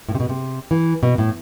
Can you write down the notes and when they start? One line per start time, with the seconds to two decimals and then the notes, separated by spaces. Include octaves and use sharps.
0.09 A2
0.15 C3
0.20 B2
0.29 C3
0.71 E3
1.03 B2
1.18 A2